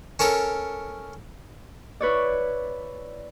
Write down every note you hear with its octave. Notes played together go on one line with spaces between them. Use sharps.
C#4 A4 A#4 C#5
E4 B4 C#5 D5